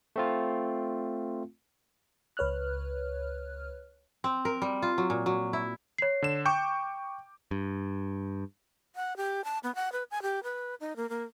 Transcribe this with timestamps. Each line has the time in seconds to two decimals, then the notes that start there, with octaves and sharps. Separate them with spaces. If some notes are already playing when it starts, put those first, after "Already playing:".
0.16 A3 C4 F4
2.37 C#2 B4 C#5 F6 F#6
4.24 C4
4.45 A#4
4.62 G3
4.82 F4
4.98 F#3
5.10 A#2
5.26 F#3
5.53 E4
5.98 C#5 C7
6.22 D3 E7
6.45 G5 C#6 D6 G6
7.51 G2
8.96 F#5
9.17 G4
9.44 A5
9.63 B3
9.75 F#5
9.92 B4
10.11 G#5
10.22 G4
10.43 B4
10.80 D#4
10.96 A#3
11.09 A#3